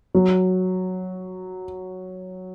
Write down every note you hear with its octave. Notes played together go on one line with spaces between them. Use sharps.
F#3